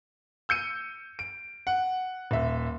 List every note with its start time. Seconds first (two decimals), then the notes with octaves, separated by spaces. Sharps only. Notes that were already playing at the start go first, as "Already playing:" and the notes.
0.49 E6 G6 C#7 D#7
1.19 D7
1.67 F#5
2.31 D#1 E5